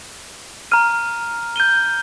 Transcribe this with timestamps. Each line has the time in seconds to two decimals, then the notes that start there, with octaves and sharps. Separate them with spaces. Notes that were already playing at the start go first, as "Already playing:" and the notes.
0.71 A#5 F6 D#7
1.56 G6 D#7 G7